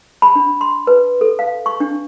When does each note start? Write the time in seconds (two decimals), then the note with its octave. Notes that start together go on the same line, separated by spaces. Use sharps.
0.22 B5
0.35 D4
0.61 C6
0.87 B4
1.21 A4
1.39 F5
1.66 C#6
1.80 D4